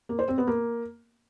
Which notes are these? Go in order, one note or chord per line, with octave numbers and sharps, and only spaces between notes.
A#3
C5
C4
B3
A#3